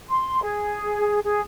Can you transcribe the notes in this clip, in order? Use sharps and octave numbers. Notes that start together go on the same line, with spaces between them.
C6
G#4
G#4